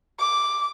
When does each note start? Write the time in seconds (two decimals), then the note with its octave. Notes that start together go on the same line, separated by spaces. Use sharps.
0.20 D6